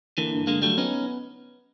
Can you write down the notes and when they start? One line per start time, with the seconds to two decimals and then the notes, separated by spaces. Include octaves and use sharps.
0.18 D3 E3 A#3
0.33 G2
0.47 D3 G#3 A#3
0.62 F#3 G3 A3
0.77 B3 C#4 D#4